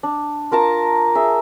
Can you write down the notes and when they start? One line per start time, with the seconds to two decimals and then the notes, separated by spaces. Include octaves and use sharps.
0.03 D4
0.51 F4 A#4 A5 A#5
1.15 G#4 E5